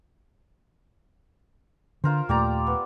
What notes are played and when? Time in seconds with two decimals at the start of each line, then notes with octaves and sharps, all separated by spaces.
2.04 D3 F4 A#4 C5
2.29 D#2 A#2 A3 G4 D5 A#5
2.67 B3